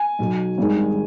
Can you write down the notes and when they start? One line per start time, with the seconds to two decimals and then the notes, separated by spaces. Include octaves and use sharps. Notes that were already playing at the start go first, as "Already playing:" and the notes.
Already playing: G#5
0.19 B1 B2 F#3
0.58 G#1 G2 D#3 G#3